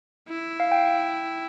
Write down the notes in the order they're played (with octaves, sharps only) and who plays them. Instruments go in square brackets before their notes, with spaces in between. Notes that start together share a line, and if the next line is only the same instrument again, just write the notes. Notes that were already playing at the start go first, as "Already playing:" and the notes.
[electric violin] E4
[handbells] F5
G5